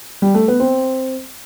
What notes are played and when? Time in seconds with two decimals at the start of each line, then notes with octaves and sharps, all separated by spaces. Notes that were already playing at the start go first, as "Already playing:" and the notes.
0.22 G3
0.34 A3
0.48 B3
0.60 C4